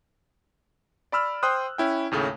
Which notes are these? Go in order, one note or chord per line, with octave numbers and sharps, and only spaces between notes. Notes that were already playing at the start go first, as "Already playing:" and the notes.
D5 B5 E6 F6
C5 G5 C6 D#6 F#6
C#4 E4 G5
D#2 A2 C#3 A3